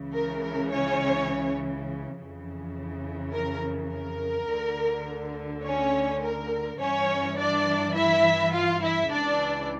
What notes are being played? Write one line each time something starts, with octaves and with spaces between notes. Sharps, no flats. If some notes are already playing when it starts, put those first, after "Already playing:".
Already playing: C#2 C#3 E3
A#4
A#4
C#4 C#5
F2 C#3 E3
A#4
A#4
D2 D3
C#4 C#5
A#4
G2 E3 C#4 C#5
D4 D5
E4 E5
F4 F5
E4 E5
C#2 C#3 E3 D4 D5